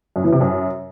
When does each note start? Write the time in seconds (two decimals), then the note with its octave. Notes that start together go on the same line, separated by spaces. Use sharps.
0.16 F#2
0.24 E3
0.32 C3
0.41 F#2